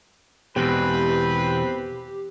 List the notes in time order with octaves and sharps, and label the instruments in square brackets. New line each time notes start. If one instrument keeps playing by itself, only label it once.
[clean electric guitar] E2 B2 [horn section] C4 B4 [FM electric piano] G4